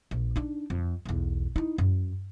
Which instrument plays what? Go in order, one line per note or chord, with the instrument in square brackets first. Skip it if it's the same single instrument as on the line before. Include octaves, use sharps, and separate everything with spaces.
[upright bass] A#1
D4 D#4
F2
B1 E2
D#4 E4
F#2